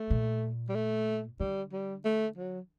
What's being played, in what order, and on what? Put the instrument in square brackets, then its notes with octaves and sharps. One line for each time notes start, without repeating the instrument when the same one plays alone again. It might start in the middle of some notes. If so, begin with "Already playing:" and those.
Already playing: [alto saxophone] A3
[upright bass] A#2
[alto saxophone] G3
A3
[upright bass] D3 [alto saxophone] G3
[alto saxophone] G3
A3
F#3